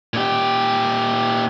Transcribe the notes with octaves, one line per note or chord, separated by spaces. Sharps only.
A#2 G4